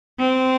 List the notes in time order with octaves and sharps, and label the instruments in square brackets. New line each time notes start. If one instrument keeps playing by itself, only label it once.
[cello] C4